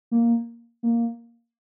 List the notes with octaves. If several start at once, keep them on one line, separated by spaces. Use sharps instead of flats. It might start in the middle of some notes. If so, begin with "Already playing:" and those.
A#3
A#3